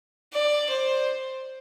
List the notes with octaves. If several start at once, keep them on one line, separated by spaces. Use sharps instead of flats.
D5
C5